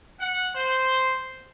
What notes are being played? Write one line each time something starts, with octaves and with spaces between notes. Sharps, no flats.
F#5
C5